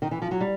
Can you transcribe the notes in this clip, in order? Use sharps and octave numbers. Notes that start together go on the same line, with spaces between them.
D#3
E3
F3
F#3
G3